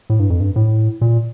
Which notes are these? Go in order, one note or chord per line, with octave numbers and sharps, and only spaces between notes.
A2
G2
F2
G2
A2
A#2